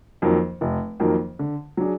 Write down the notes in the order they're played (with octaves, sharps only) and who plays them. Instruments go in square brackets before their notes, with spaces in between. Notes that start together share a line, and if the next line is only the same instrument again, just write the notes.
[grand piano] F2 D#3 F#3 A#3
F1
F2 D#3 F#3 A#3
D3
F#3 D4 G#4